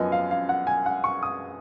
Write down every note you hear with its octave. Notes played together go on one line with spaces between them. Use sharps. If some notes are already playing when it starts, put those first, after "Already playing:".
Already playing: F#2 F3 B3 D#5 G#5
F5
F5
F#5
G#5
F#5
C#6
D#6